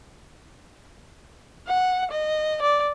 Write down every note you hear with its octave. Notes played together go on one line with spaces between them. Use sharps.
F#5
D#5
D5